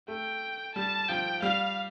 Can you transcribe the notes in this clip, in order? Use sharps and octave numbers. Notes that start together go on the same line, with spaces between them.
A3 G5
G3 A5
F3 G5
G3 F5